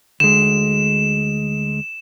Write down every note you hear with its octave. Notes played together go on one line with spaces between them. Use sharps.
D2 G#3 E7